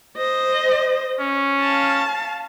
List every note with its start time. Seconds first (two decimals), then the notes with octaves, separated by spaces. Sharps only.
0.17 C5 D#5
1.20 C#4
1.60 F5 A5